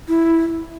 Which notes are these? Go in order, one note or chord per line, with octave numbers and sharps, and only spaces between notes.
E4